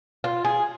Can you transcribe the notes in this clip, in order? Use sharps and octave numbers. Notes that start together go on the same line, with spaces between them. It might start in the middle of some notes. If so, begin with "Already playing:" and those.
F4
G#4